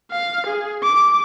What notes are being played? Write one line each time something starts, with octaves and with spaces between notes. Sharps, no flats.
F5
G#4
D6